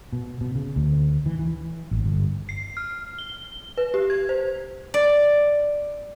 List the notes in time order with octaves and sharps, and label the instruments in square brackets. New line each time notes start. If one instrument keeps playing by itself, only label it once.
[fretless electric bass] B2
B2
C#3
D2
E3
E3
A1
G1
[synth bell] C7
F6
G7
B4
G4
G#6
C5
[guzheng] D5